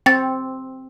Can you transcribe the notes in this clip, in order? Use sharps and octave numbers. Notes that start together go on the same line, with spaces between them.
C4 G5 A6